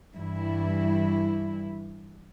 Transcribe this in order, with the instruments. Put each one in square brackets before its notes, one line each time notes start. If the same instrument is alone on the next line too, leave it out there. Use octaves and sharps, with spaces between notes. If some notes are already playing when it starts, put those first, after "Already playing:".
[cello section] G2 E3 E4